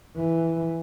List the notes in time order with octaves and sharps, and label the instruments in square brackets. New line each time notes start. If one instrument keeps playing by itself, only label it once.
[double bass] E3